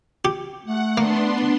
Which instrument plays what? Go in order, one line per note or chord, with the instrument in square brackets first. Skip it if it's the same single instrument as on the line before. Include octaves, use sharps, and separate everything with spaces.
[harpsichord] G4
[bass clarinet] A3 [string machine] F#5
[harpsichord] A#3 [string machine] B3 D4 C6